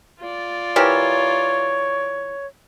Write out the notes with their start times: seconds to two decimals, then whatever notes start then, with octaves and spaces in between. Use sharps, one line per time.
0.20 F4 D5
0.76 E3 G4 A#4 C#5